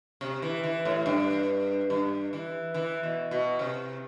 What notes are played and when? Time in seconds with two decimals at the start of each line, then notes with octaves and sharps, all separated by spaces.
0.21 C3
0.42 E3
0.63 E3
0.85 A2
1.06 G2
1.90 G2
2.33 E3
2.74 E3
3.03 B2
3.31 B2
3.59 C3